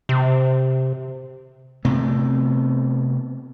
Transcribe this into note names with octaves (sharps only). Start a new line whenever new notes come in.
C3
C3 A3 B3 C4